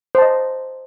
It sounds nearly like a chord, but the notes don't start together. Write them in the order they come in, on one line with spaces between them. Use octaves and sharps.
C5 A5 D#5